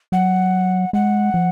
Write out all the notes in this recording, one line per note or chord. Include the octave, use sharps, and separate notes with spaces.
F#3 F#5
G#3 F#5
F3